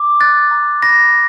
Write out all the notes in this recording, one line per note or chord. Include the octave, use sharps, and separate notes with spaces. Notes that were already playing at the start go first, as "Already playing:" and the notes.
Already playing: D6
F#6 A6
A#5
B5 A#6